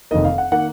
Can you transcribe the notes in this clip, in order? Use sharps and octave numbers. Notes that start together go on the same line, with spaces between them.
F1 F2 D#3 A#3 D#5
F5
F#5
D#3 A#3 F#5